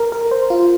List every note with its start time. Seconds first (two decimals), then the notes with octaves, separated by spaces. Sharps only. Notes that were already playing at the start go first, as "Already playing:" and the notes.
Already playing: A#4
0.12 A#4
0.31 C5
0.50 F4